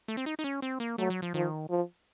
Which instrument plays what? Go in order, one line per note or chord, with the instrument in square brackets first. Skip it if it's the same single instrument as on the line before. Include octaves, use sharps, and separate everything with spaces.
[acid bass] A3
C4
D#4
D#4
C#4
C4
A#3
[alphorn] F#3 [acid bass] A3
[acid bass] F#3
F3
[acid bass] D#3 [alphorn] F3
[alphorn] F3